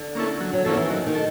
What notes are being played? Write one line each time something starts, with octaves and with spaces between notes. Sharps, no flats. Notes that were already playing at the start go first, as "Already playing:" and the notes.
Already playing: D3
A#3 C#4 E4 A4
F#3
F#3
F3 A#3 C#4 E4 A4
E3
D#3 F#3
D#3
A4